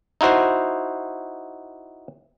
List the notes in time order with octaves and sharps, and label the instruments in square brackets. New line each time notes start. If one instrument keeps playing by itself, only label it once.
[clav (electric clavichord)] D#4 E4 F#4 C5